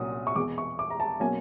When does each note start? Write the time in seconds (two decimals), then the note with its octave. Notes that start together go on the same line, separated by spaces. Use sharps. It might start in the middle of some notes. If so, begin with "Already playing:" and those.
Already playing: C2 A#2 F#3 C#4 D#6
0.27 C#6
0.36 E2 B2 G#3 D6
0.58 C#6
0.79 D6
0.90 A#5
1.00 A5
1.20 B2 F#3 A#3 C#4 G#5